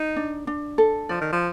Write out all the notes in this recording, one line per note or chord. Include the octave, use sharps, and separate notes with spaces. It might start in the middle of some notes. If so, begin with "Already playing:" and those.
Already playing: D#4
D4
D4
A4
F3 D5
D#3
F3